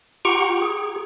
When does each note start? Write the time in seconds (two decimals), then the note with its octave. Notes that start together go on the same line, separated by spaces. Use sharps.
0.25 F4 G4 F#5 G5 A#5 C#6
0.62 G#4